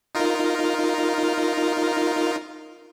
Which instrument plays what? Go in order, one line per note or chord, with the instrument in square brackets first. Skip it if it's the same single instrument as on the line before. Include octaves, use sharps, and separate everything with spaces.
[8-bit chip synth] D#4 F4 A#4